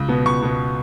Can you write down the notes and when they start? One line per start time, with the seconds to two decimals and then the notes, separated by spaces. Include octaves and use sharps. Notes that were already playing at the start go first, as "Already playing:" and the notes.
Already playing: C#2
0.08 B2 B3
0.25 C#2 C#6
0.42 B2 B3